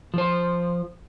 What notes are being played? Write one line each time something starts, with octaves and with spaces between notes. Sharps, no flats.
F3 C5